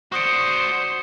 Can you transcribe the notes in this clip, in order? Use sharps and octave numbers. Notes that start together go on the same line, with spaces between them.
F#4 C5 D5 C#6 D#6 C#7